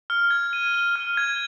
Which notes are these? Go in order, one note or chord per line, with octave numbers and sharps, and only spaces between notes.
F6
G#6
D#7
G7
F6
G#6